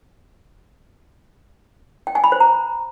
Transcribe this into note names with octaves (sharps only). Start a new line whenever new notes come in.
G5
G#5
B5
C5
A#5